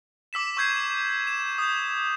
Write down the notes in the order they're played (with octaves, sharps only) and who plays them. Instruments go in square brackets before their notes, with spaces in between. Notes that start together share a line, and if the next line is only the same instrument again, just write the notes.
[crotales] D6 E6 B6 E7
C#6 E6 G6 G#6 C7
E7
D#6 G6